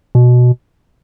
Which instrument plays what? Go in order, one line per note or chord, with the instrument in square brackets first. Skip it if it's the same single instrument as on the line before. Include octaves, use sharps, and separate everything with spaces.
[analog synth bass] B2